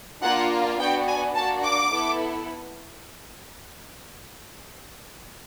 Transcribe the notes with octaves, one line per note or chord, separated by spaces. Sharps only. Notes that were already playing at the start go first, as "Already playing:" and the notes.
A#3 D4 F4 F#5
B3 D4 F#4 G5
G#5
A#3 D4 F#4 A5
D6
B3 E4 A4